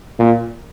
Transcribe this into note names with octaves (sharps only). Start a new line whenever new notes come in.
A#2